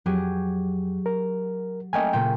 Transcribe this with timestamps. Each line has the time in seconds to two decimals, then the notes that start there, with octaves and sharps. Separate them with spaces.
0.06 F2 F#3 G4 G#4
1.06 A#4
1.93 A3 A#3 C#4 D#5 G5 G#5
2.13 A#2 C#3 A#3 G5